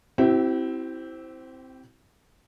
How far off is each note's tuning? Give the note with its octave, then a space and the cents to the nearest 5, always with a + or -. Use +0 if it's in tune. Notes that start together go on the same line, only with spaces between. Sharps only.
C4 +0 E4 +0 G4 -40